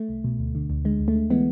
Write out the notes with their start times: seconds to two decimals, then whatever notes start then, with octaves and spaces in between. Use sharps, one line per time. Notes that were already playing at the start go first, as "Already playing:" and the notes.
Already playing: A3
0.09 C2
0.24 B2
0.39 D2
0.55 D3
0.70 D2
0.85 D3 G#3
1.00 D2
1.08 A3
1.15 D3
1.30 E3 G#3 B3